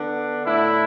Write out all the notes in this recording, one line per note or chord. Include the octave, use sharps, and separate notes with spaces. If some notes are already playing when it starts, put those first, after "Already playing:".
Already playing: D3 B3 D4
A2 A3 D4 E4